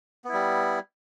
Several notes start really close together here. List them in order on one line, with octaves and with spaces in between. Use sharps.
B3 E4 G3